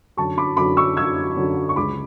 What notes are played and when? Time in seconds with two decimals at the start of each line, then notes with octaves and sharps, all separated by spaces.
0.17 F#2 D3 F#3 A5 C#6
0.38 B5 D6
0.57 F#2 D3 F#3 B5 D6
0.77 C#6 E6
0.97 F#2 D3 F#3 E6 G#6
1.36 F#2 D3 F#3
1.69 C#6
1.76 C#2 C#3 G#3 B5 D6